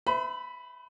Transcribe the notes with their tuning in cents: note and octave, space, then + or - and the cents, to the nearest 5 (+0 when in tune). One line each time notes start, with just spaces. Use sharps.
C5 -45 E5 +0 B5 +0